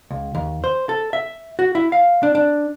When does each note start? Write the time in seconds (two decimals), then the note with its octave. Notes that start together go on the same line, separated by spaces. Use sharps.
0.11 C#2
0.35 D#2
0.64 C5
0.89 A4
1.13 E5
1.59 F#4
1.75 E4
1.92 F5
2.23 D4
2.35 D4